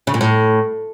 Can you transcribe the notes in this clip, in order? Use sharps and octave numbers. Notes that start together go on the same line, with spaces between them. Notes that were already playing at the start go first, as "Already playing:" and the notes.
C#3
A#2
A2